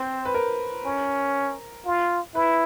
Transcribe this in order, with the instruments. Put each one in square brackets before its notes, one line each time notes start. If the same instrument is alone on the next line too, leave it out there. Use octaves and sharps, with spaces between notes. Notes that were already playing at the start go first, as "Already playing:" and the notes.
Already playing: [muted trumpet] C4 [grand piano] C5
[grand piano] B4
A#4
[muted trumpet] C#4
F4
[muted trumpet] E4 [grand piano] B4